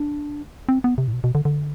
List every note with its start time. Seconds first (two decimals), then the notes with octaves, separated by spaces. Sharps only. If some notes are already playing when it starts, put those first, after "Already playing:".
Already playing: D4
0.69 C4
0.84 B3
0.98 C3
1.08 A2
1.13 B2
1.24 B2
1.35 D3
1.45 D3